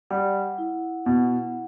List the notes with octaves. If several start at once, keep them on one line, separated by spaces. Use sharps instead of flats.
G3 F#5
E4
B2 F#5